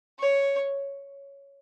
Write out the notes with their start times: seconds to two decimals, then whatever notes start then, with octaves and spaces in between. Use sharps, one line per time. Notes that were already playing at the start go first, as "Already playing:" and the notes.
0.19 C#5